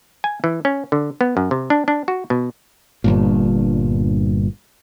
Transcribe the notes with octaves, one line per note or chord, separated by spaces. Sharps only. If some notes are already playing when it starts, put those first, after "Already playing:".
G#5
E3
C#4
D3
B3
F#2
C3
D4
D4
F#4
B2
G1 G2 A#2